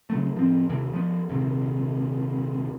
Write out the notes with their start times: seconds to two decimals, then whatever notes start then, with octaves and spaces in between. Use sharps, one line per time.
0.10 C#3 F#3 A3
0.35 A1 F3 C4
0.69 D#2 C3 E3
0.93 F3 B3
1.29 A#1 D#2 C3